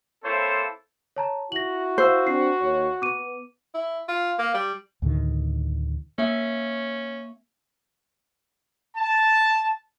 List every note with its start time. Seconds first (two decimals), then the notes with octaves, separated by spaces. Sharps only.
0.25 A#3 C4 E4 A4 C5 C#5
1.16 C#5 A5 A#5
1.52 E4 F#4 A#6 F#7
1.98 C5 F5 E6 G6
2.27 C4 D4 C7
2.61 D#2 C#5
3.02 B3 D6 D#7
3.74 E4
4.09 F4
4.39 A#3
4.54 G3
5.02 D2 A2 D3 D#3
6.18 A#3 C#4 E5
8.96 A5